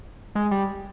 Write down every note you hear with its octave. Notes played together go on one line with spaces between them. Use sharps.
G#3
G3